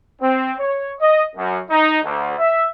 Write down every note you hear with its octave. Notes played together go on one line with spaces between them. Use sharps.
C4
C#5
D#5
F#2
D#4
D2
E5